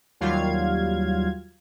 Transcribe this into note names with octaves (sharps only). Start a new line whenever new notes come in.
D#2 F#3 G3 F4 F5 G#6